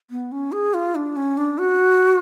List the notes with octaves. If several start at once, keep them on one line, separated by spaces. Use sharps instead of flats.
B3
C#4
G#4
F4
D4
C#4
D4
F#4